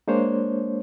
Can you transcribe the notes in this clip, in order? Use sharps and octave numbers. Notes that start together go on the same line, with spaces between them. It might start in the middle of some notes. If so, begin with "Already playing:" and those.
G#3 A#3 D4 C5 C#5